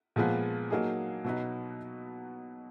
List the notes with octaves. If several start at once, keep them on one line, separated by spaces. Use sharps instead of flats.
A#2 F3 G#3 B3
F#3 A#3 D#4 G#4
B2 F#3 B3 D#4